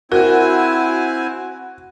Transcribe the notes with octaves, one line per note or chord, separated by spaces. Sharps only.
C4 E4 F#4 A#4 G#5